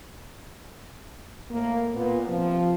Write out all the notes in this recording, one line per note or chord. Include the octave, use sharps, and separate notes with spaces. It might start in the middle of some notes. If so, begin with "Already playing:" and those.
A2 A#3
A#2 B3
C3 F3